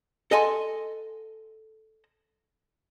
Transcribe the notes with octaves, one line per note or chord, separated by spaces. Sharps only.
A4 D#5 F#5 G#5 A5 C6